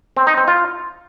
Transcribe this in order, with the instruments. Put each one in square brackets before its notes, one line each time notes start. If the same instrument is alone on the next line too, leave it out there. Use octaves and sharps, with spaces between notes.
[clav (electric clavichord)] C4
D#4
C4
F4